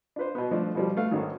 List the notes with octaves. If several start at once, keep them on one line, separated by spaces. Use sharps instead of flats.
D4 F4 B4 C5
B2 B3
F3 A3 D4
B2 F3 G3
A3 B4 F5
G#1 D#3 C#4 D#4